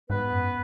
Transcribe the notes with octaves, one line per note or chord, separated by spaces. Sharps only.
G#2 B3 B4
F#2